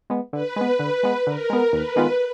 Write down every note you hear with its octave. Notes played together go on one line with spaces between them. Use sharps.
G#3 B3
D3 B4
G#3 B3
D3
G#3 B3
D3 A#4
G#3 B3
D#2 B4
D#3 G#3 B3 F4